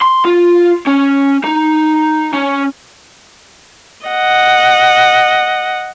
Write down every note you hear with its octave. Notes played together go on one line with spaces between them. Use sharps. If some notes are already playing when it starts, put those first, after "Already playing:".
C6
F4
C#4
D#4
C#4
D#5 F#5